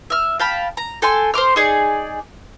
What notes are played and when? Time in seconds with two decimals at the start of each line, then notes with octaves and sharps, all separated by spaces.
0.10 E5 F6
0.40 F5 G5 A5 B5
0.77 A#5
1.02 A4 G5 G#5 C6
1.34 C5 C6 D6 F6
1.56 D#4 G#4 D5